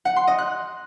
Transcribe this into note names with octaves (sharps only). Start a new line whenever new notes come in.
F#5
C6
D#5
F#6